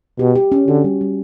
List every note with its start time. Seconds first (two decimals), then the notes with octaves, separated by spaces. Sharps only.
0.19 B2 G4
0.35 G4
0.52 C#4
0.68 D3 F#4
0.84 G3
1.01 G3